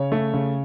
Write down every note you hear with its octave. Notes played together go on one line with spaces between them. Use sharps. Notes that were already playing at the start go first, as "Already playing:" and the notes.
Already playing: C#3 C#5
A3
C#3